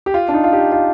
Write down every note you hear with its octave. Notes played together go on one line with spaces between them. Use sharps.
G4
F4
D4
D#4
F4
G4
F4